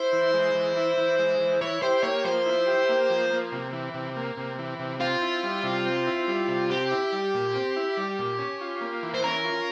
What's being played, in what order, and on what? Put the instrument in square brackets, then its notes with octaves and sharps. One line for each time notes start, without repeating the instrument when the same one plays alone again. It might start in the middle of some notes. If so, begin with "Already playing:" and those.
Already playing: [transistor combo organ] E4 [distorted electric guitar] C5
[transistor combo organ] E3
G#3
E3
E4
E3
G#3
E3
[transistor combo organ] E4 [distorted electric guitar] C#5
[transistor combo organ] G4 [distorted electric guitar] C5
[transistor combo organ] A#3 [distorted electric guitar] C#5
[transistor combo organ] F3 [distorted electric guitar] C5
[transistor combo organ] E4
G4
A#3
F3
A#3
C3
E3
C3
A#3
C3
E3
C3
[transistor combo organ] C4 [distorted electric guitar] F4
[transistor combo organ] E4
G3
C3
C4
E4
G3
C3
[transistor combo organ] C4 [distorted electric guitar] G4
[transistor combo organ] E4
G3
A#2
C4
E4
G3
A#2
C#4
F4
A#3
E3
[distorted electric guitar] C5
[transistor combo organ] C#4 [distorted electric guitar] A#4
[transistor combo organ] F4